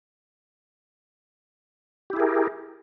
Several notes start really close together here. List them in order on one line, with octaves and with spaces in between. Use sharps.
G4 E4 G#4 A#4